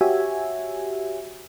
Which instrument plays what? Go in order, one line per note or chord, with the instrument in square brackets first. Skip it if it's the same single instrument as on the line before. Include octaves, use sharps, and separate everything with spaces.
[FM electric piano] F#4 G4 C#5 E5 G#5